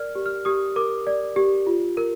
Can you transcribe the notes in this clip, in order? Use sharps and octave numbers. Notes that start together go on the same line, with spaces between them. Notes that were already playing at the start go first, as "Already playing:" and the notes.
Already playing: A#4 D5 F6
G4
F6
G4 D#6
A#4 D6
D5
G4
F4
A#4